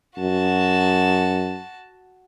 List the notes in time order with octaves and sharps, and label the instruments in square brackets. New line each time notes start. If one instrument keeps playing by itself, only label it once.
[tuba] F#2 [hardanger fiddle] F#4 A5